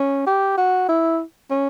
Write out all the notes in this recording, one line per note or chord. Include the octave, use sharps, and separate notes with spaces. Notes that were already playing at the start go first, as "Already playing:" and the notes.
Already playing: C#4
G4
F#4
E4
C#4